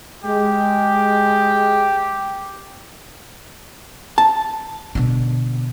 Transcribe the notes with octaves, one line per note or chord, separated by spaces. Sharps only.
G#3 G4
A5
B2 D3